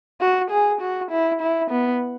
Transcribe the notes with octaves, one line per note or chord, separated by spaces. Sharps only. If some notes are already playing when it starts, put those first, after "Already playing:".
F#4
G#4
F#4
E4
E4
B3